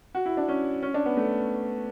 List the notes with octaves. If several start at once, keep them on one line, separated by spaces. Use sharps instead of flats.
F#4
E4
D4
C#4
C#4
D4
B3
A3